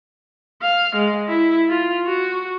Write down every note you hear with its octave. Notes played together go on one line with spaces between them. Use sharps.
F5
G#3
E4
F4
F#4